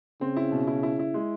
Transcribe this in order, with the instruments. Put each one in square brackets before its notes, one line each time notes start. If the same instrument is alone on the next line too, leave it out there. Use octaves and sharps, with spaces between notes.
[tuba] C#3 [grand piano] C4
[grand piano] E4
B2
E4
E4
E4
G#3